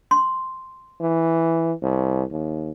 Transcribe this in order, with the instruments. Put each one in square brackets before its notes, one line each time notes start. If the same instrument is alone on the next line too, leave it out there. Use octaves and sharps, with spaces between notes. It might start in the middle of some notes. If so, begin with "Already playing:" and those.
[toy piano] C6
[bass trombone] E3
C2
D#2